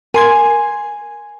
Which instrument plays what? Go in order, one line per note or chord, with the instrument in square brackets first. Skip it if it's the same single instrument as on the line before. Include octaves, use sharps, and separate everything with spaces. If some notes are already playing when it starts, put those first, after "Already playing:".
[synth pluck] A#4 C6 G#6 [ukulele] G#5